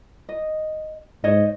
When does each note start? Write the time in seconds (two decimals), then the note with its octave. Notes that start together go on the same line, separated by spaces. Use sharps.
0.29 D#5
1.24 G#2 C5 C#5 D#5